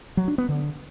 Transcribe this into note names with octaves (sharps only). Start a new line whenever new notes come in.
F#3
D4
B3
D3